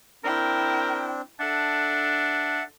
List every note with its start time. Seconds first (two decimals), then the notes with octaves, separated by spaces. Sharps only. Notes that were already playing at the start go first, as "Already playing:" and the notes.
0.24 C4 D4 E4 A#4 G5
1.40 D4 A4 E5 F#5